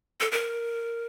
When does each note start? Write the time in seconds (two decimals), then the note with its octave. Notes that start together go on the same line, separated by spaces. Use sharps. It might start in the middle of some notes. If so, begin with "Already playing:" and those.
0.20 A4
0.32 A#4